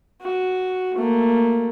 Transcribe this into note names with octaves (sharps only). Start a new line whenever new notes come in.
F#4
A3 A#3